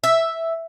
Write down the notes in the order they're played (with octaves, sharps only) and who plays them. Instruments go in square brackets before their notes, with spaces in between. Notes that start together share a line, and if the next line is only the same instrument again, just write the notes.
[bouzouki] E5